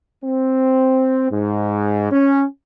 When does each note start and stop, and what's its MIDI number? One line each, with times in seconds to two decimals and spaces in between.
0.24 1.31 60
1.31 2.11 44
2.11 2.44 61